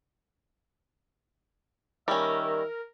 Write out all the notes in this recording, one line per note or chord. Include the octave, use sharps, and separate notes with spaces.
D#3 G3 C#4 A#4 E5